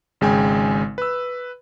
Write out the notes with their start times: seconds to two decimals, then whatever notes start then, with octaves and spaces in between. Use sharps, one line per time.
0.21 G#1 C#3 G#3 G5 G#5
0.98 B4 E6